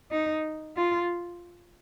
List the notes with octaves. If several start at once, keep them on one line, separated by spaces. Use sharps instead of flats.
D#4
F4